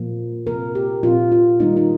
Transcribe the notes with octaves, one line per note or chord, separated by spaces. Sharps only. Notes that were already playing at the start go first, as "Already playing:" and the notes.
Already playing: A#2 F3 A#3
C3 F3 A#3 A#4
G4
A#2 F3 C4 F4
F4
D#3 G3 A#3 D#4
D#4